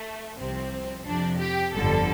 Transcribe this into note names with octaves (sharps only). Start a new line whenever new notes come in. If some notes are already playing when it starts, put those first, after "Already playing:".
Already playing: A3
C2 C3 F3 C4
F2 C3 F3 D4
G4
G1 F2 D3 G3 A4